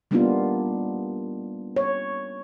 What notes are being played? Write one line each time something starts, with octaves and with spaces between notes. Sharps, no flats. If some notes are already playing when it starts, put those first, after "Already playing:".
G3 A#3 B3 D4 D#4 F4
C#5